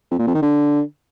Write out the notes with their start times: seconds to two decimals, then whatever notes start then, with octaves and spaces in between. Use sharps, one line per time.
0.11 F2
0.19 A#2
0.27 F2
0.35 D#3
0.42 D3